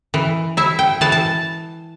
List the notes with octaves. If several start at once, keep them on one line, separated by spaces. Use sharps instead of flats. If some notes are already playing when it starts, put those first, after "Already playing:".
E3
E4 E5
G5
E3 A5
A5